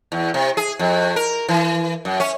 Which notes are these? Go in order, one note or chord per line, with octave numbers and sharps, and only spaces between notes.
E2
C3
G#4
F2
A#4
E3
F#2
C#4